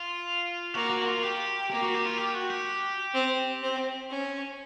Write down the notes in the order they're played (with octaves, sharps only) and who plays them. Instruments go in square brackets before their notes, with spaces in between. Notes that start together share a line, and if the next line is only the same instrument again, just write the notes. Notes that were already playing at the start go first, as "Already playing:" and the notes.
Already playing: [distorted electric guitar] F4
[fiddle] A#3 [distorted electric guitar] F#4
[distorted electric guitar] F#4
F4
G4
[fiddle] A#3 [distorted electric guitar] G4
[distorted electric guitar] F#4
G4
F4
G4
F#4
G4
[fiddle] C4
C4
C#4